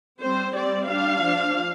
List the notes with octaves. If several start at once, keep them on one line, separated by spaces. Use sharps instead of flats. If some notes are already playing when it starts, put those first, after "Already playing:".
G3 C4 C5
G3 C4 D5
G3 D4 F5
F3 D4